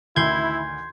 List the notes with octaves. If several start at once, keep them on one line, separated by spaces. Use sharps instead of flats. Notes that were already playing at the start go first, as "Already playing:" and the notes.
A1 D2 D#3 E4 C6 G6 G#6